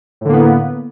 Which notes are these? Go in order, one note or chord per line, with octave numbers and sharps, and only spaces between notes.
A2 D3 A#3 B3